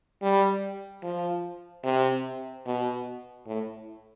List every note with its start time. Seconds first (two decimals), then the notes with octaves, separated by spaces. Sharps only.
0.22 G3
1.03 F3
1.84 C3
2.66 B2
3.47 A2